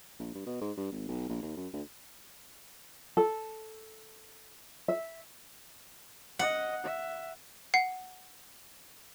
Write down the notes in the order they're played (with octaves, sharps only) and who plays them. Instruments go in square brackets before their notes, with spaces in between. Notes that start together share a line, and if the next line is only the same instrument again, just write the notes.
[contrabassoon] A#1
G2
B2
G#2
G2
G#1
B1
A#1
D#2
F#2
D2
[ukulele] A4
E5
[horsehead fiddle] D#5 [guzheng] F#5
[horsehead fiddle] E5
[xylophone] F#5 C7